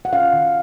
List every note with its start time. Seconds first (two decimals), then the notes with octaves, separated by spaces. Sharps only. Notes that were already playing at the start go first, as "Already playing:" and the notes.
0.05 F#5
0.12 C#4 F5
0.33 D#3